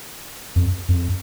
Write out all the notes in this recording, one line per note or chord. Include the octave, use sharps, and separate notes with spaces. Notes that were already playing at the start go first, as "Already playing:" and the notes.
F2
F2